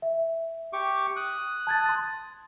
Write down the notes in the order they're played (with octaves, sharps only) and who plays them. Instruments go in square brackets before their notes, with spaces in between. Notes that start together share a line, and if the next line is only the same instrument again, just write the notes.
[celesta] E5
[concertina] G4 C#6 D6
D#6 F#6
[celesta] A5 G#6 A6
C6 A6